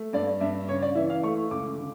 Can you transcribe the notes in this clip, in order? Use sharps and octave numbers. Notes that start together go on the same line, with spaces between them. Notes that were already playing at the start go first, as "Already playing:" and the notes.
Already playing: A3
G2 D5
G2 E5
C#3 C#5
D5
E3 E5
F5
A3 C#6
C#2 D6
D3